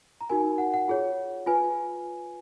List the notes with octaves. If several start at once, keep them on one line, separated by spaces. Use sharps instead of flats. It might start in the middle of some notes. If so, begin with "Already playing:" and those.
A#5
D#4 F#4 A#4 G#5
F#5
F#5
F4 G#4 C#5
F4 B4 G#5